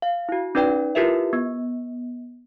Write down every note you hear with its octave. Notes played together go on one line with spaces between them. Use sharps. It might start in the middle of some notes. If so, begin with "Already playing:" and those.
F5
E4 F#4
C#4 D#4 B4 D5 G5
E4 F4 G4 A#4 B4 E5
B3